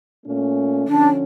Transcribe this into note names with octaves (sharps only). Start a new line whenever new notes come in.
A#2 A3 C#4
D3 F3 C#4 D4